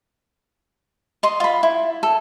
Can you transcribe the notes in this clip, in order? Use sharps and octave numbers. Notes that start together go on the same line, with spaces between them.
D#5 C6
F4 B5
E4
A4